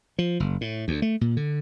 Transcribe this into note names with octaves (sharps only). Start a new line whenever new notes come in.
F3
F#1
A2
D2
A3
A#2
D3